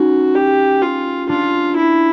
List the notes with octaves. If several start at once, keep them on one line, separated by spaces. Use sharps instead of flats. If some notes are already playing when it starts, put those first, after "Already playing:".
Already playing: C#4 D#4 F#4
G4
F4
D4 F4
E4